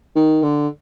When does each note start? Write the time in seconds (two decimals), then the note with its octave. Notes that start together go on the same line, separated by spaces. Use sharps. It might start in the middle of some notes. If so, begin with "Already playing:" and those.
0.16 D#3
0.43 D3